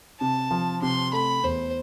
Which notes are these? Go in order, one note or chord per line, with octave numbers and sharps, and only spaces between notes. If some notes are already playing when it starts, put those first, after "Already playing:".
C3 A5
F3
C3 C6
A3 B5
E2 C5